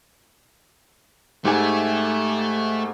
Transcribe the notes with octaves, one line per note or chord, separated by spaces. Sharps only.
G#2 A3 G4 G#5